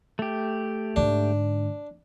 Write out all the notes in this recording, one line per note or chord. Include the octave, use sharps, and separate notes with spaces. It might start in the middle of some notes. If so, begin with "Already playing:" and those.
A3 G4
G#2 D3 D4